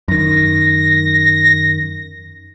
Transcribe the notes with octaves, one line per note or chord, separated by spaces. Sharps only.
F#2 D#3 A#6